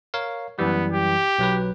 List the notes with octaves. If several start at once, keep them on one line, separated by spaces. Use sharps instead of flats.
A#4 C#5 F5
F#2 E3 G3 B3
G4
B1 F#3 B4